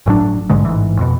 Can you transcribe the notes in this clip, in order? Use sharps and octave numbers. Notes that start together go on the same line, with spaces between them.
G1 A2 F#3 D4
A#1 G#2 D3 G#3
A1 G#2 E3
F2 B2